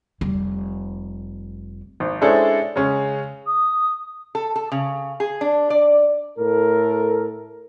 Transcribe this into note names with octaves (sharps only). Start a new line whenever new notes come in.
F1 G3
G#1
G#3 C#4 D4 E4 A4 C5
C#3 G#3 C#4
D#6
A4
A4
C#3
G#4
D4
D5
A2 A4 A#4